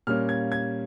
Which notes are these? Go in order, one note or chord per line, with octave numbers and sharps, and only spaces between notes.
A#2 G3 A#3 C#4 F6
G#6
G#6